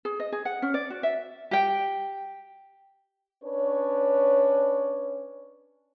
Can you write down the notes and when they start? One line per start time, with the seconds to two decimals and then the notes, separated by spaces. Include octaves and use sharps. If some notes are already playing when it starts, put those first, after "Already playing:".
0.05 G#4
0.20 D#5
0.32 G#4
0.45 F#5
0.62 C#4
0.74 D5
0.90 F#4
1.03 E5
1.51 G4 G5
3.44 C#4 D4 B4 C#5